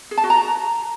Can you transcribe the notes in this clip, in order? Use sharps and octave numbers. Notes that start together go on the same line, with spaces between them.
G#4
A5
F#4
A#5